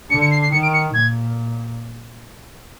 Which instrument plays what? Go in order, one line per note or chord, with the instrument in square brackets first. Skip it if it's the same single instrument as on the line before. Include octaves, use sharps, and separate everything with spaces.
[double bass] D3 [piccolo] C#7
[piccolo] C#7
C7
C7
[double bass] D#3 [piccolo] C#7
[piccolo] D7
C#7
[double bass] A#2 [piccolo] G#6